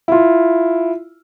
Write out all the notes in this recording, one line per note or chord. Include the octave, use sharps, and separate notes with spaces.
E4 F4